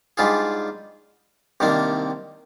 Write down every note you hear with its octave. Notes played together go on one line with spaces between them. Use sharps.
G#2 G3 D4 F4 G#4
C2 C3 D#3 A#3 D4